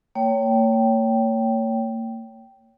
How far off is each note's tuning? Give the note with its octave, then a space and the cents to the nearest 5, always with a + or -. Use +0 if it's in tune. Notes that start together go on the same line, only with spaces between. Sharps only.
A#3 -40 C#5 +15 G5 -10